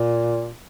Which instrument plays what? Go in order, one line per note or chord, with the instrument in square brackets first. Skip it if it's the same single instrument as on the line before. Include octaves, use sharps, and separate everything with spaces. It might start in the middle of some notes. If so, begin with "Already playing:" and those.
Already playing: [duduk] A#2